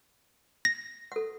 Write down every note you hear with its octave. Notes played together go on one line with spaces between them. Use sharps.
A#6
A4 F#5